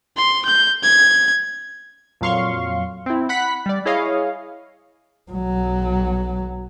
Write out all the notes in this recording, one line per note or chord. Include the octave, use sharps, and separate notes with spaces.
C6
G6
G#6
F2 A#2 F#3 F5 C6 C#6
C4 E4
F#5 B5 F#6 B6
G3 D5
E4 G#4 C#5 D#5 F5
B1 F#3